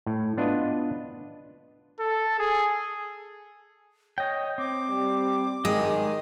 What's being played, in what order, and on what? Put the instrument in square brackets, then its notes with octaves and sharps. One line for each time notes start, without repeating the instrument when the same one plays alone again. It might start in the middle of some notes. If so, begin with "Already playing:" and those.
[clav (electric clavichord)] A2
B3 D4 F4 B4 D#5
[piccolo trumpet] A4
G#4
[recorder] C#5 [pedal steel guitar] D#5 G5
[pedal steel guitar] C4 [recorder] D6
[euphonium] G3
[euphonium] D#3 [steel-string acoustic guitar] G#3 [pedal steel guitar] D#5 D#6